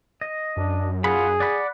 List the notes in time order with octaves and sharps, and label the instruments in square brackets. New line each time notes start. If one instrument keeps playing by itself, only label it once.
[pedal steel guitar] D#5
[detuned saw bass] F#2 [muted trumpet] D4
[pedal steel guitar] F4 F#5 B5 [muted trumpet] G#4
[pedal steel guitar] D5 F#5 B5